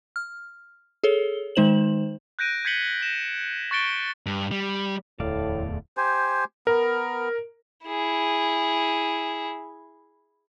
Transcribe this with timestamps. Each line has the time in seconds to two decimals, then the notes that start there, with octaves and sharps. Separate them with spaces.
0.16 F6
1.04 G#4 A4 C#5 G7
1.55 D#3 G#3 D#4 C5 E7 F#7
2.39 F#6 G6 A#6 D7 D#7
2.65 G6 G#6 B6 C#7 F#7 G7
3.01 A#6 E7
3.71 C#6 F#6 A6 C#7 D7 G7
4.26 G2
4.51 G3
5.20 D1 E2 A2 A3 D5 F5
5.97 G4 C5 G#5
6.67 B3 A#4
7.87 E4 G#4